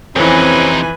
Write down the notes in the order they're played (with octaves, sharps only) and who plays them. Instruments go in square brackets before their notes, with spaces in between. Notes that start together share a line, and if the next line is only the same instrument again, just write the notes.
[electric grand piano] F2 E3 [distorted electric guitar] C3 D#4 [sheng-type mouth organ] C4 C#4 [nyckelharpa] B4 G#5